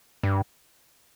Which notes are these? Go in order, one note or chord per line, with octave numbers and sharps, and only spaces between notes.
G2